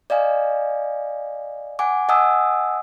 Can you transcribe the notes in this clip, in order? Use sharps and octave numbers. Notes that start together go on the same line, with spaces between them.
D5 D#5 F5 G#5
F#5 G#5 D6
D#5 F#5 G#5 A5 D#6 E6